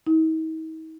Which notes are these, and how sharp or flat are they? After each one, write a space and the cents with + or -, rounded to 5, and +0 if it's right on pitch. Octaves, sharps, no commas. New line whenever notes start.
D#4 +45